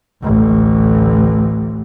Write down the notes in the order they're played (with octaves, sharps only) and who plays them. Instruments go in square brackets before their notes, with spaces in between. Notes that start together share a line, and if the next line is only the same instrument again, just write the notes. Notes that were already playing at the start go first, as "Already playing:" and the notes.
[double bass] A1 D2